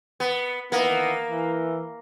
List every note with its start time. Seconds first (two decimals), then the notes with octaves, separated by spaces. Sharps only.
0.20 B3
0.72 D#3 E3 A#3 B3
1.29 E3